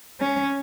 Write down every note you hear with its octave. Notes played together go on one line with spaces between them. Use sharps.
C#4